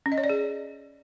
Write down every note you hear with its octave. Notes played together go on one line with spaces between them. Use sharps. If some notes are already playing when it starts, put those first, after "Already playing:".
C#4
D#5
C#5
D5
G#4